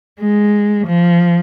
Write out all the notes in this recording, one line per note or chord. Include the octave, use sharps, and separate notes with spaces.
G#3
F3